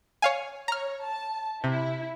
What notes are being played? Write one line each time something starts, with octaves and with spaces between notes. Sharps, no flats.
C#5 F5 G#5
C#5 A#5 F6
A5
C3 E4